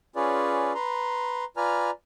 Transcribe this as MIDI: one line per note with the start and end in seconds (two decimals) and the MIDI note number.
0.16 0.73 61
0.16 0.73 65
0.16 0.73 68
0.16 0.73 71
0.16 0.73 73
0.16 0.73 74
0.75 1.44 71
0.75 1.44 82
0.75 1.44 84
1.57 1.90 65
1.57 1.90 71
1.57 1.90 74
1.57 1.90 80
1.57 1.90 82
1.57 1.90 89